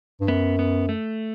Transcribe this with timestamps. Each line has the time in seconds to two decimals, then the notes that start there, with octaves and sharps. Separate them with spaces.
0.21 G2
0.28 F#2 B3
0.59 B3
0.89 A3